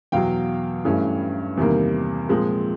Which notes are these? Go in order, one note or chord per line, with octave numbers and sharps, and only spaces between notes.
E2 B2 F#3 F5 G5
G2 E3 A3 C#4
E2 C3 D#3 G3 A#3
A#2 F3 G#3 C4